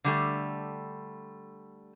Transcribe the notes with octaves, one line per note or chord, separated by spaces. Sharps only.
D3 G3 A3